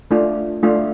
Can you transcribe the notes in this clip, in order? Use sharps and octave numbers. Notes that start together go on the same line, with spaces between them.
A3 D4 F4
A3 D4 F4